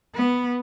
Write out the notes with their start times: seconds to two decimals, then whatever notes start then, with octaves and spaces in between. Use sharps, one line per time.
0.15 B3